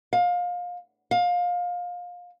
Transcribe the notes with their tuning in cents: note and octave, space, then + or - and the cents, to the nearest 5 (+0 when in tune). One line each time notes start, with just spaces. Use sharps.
F5 +25
F5 +25